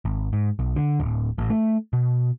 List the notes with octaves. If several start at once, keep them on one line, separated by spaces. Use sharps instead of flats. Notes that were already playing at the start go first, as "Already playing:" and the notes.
G#1
G#2
B1
D3
D1
A1
A3
B2